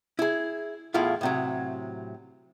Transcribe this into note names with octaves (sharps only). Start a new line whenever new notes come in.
E4 G#4
E2 A2 E4 F4 F5
A2 C3 F#3